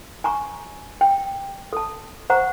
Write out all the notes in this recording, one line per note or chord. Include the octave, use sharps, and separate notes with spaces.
G#5 A#5 C#6
G5
A4 A5
C5 F#5 A#5 C#6